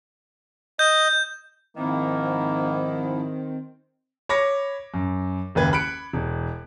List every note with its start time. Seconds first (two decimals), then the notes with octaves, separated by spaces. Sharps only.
0.79 D#5 G6
1.77 G#2 D#3 F3 A#3 C4 E4
4.29 C#5 B5 D6 A#6 C#7
4.94 F#2
5.55 F#1 D#2 B4 G#6
5.73 B5 F#6 C#7 D7
6.13 E1